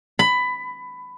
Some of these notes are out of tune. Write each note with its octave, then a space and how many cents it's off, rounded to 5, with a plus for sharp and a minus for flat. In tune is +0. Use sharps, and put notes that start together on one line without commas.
B5 +15